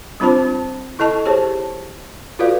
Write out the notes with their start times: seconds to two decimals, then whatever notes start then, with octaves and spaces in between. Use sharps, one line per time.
0.20 G3 C4 D4 F4 C5 A5
0.99 E4 A4 D#5 A5 C#6
1.25 G4 G#4 C5 C#5 A5
2.39 F4 F#4 A4 B4 D5 F5